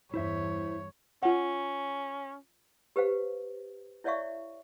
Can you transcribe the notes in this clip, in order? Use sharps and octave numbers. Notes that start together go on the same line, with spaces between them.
E2 G2 E4 C5 C#5 E5
C#4 F4 F#5
G4 B4 C5 F5
E4 C#5 D5 E5 F5 C#6